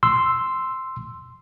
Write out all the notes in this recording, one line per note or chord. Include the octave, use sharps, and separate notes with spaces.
C6 E6